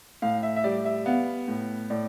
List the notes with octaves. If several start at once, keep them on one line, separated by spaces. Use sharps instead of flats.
A2 F5
E5
E5
G3 D5
E5
B3 F5
A2
A2 D5